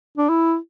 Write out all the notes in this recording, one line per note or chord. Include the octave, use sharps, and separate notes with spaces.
D4
E4